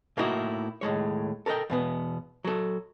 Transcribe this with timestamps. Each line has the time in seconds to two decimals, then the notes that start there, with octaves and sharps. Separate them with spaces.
0.17 A2 A#3 B3 D#4 E4 F#4
0.81 D#2 A2 G#3 C#5
1.46 A4 A#4 C#5 D#5 G5
1.70 E2 B2 B3
2.44 F#3 A4